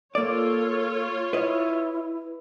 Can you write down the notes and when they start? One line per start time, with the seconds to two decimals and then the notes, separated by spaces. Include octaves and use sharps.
0.15 A#3 F4 A4 C#5 D5
1.33 E4 B4 D#5